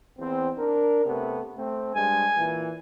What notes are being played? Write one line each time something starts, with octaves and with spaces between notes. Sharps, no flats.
E2 C4
D4 A#4
C3 A3 B3
A3 C4
G2 G#3 G#5
A#2 E3